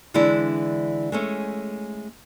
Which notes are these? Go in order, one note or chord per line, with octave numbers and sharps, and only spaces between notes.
D3 E3 G#3 D4 E4
G#3 A3 C#4